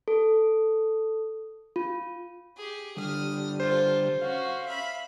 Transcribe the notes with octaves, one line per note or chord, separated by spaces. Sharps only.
A4
F4
G4 G#4
D3 G3 D#6 F6
F4 A4 C5
C#4 F#4 F5
E5 B5